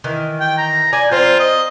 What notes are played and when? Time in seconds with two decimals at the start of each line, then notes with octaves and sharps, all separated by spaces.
0.04 D#3 E3
0.40 G5
0.58 A#5
0.93 D5 G#5
1.11 C4 F4 C5 A#5
1.39 D#5